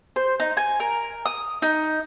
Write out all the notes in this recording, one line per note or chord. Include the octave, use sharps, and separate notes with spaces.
C5
D#4
G#5
A#4
D#6
D#4